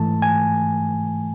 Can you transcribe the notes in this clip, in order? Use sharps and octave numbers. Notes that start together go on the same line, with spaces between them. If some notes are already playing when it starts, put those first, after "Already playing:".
Already playing: G#2 E3 A3 A5
G#5